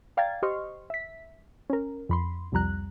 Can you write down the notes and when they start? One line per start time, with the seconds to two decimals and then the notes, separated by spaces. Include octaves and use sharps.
0.17 D5 F5 G5 A#5 G#6 A6
0.42 G4 C5 D#5 C6 C#6 F6
0.90 E5 B6
1.70 C#4 A#4
2.09 F2 B5 C6
2.52 C2 F2 G3 A#5 F#6